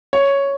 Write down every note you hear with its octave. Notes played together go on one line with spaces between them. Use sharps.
C#5